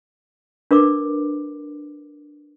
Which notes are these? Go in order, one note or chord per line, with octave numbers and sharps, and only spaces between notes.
D4 A#4 B4 D6